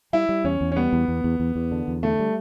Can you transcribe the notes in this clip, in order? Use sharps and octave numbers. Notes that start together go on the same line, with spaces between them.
G3 E4
G3
E2 C#4
E2
C#4
G3 B3
E2
E2
E2
E2
E2
D3
E2
D3 A3
G3